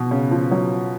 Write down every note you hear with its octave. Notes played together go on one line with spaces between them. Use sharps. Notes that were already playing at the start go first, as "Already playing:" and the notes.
Already playing: B2
C#3
F3
F#3